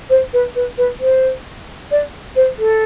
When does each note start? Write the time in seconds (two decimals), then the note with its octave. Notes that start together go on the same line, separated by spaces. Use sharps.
0.10 C5
0.33 B4
0.55 B4
0.78 B4
1.00 C5
1.91 D5
2.36 C5
2.59 A4